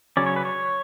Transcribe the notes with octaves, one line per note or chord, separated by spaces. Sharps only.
C#3 F#3 C#4 D5
C#5
B4
C#5